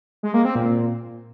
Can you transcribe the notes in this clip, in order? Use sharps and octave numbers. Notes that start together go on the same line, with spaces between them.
G#3
A#3
C4
A#2